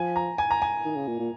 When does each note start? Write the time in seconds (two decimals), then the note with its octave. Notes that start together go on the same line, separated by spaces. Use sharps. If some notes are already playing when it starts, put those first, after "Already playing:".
Already playing: F3 G#5
0.16 A#5
0.38 G#5
0.51 A#5
0.62 G#5
0.84 D#3
0.96 C#3
1.08 A#2
1.19 A#2